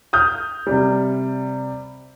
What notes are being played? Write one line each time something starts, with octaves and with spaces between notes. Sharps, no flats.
D#6 F6 G6
C3 G3